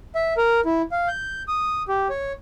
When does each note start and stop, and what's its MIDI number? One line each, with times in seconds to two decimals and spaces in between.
0.15 0.34 76
0.37 0.61 70
0.65 0.82 64
0.92 1.08 77
1.08 1.43 91
1.48 1.83 87
1.88 2.08 67
2.10 2.33 73